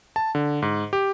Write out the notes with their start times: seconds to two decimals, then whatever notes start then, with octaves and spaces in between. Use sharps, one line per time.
0.16 A5
0.35 D3
0.62 G#2
0.93 G4